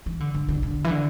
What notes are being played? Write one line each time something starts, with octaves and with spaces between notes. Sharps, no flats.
E3
D3
D3
D3
D3
E3
D3